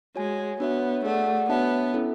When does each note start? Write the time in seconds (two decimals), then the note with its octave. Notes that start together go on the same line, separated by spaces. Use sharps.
0.16 G#3 F#4 C#5 G#5
0.60 B3 D4 F#4 C#5 E5
1.04 A3 G#4 D5 F#5
1.49 B3 D4 F#4 C#5 E5 A5
1.94 C#4 E4 A4 E5